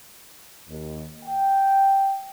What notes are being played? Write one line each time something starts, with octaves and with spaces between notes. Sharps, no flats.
D#2
G5